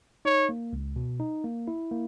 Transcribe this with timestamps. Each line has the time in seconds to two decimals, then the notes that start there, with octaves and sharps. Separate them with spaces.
0.25 D#4 C#5
0.49 A#3
0.73 C#2
0.96 B2
1.20 D#4
1.44 A#3
1.68 E4
1.92 A#3